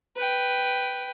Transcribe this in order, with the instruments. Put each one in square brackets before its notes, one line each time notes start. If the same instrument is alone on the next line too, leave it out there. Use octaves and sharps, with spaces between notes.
[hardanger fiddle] B4 G5